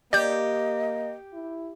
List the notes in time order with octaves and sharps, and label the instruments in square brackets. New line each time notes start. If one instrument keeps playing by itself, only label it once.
[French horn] A#3 [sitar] G4 [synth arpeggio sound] D5 G6 [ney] D#5
[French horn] E4